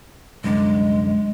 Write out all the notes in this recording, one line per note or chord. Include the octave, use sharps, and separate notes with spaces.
C2 F#2 D3 G#3